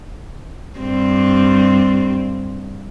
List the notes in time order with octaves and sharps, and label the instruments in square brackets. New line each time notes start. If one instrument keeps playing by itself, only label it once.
[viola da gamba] G2 G3 C4